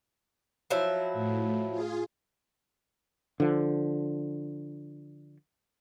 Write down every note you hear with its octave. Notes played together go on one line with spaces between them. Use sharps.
F3 F#3 E4
A2
F4 G#4
D3 F3